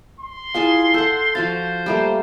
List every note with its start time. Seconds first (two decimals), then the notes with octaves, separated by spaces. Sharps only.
0.20 C6
0.55 E4 F4 G#4 F5 G#5 A5
0.94 A4 F#5 E6 G6
1.35 F3 F#4 C5 F5 A6
1.86 G3 A3 A#3